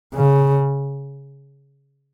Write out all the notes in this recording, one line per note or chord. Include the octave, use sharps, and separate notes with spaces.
C#3